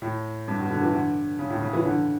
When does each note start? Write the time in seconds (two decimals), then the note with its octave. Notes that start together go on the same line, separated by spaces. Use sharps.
0.02 A2
0.48 G2
0.59 B2
0.70 D3
0.82 E3
0.93 D3
1.39 C#3
1.50 A2
1.62 C#3
1.73 E3
1.85 D3